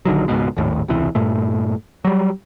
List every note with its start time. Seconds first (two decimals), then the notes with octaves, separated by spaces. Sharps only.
0.05 A#1 D3 D#3 F#3
0.28 C#2 G#2 B2
0.57 D#1 G#1 D#2 A2
0.88 E1 C#2 C3 E3
1.15 G2 A#2 A3
2.05 F#3 G3